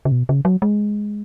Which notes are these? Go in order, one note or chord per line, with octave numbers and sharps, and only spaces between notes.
C#3
B2
C#3
F#3
G#3